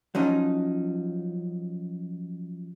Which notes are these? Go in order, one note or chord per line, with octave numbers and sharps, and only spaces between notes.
F3 F#3 C#4 D#4